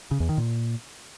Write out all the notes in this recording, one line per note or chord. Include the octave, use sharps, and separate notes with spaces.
C#3
E2
D#3
A#2